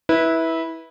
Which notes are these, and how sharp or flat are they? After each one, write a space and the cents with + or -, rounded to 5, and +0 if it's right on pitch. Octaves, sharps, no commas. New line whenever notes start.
E4 -15 B4 -15